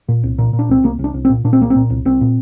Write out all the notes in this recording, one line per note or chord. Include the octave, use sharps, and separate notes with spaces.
A#2
C2
A#2
A#2
D4
C2 C4
C2 A#3
C2
D4
C2
C4
A#2
A#2 D4
C4
C2 A#3
C4
A#2
C2
C2 C4
A#2